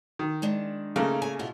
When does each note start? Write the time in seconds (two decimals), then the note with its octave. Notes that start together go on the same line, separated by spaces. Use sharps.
0.19 D#3
0.42 G#3 D4
0.96 C#3 A3 A#3 D#4
1.22 G#5
1.39 B2 E4 F4